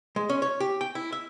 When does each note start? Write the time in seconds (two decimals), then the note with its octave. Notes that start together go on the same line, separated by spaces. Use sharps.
0.16 G#3
0.29 C#4
0.42 C#5
0.60 G4
0.81 G5
0.95 E4
1.12 E5